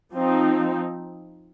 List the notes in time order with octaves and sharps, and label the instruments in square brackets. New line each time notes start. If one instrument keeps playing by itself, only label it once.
[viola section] F3 C4 D#4